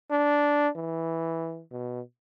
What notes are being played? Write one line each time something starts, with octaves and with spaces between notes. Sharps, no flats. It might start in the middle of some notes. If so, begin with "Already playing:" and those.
D4
E3
B2